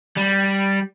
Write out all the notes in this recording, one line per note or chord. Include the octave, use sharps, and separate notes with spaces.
G3